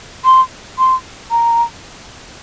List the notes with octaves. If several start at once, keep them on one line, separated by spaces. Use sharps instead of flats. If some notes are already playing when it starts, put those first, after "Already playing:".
C6
C6
A#5